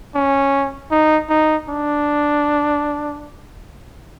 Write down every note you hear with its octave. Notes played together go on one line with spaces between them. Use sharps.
C#4
D#4
D#4
D4